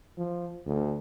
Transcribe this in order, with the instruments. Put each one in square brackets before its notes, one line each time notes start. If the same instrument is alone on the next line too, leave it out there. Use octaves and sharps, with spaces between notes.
[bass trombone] F3
D2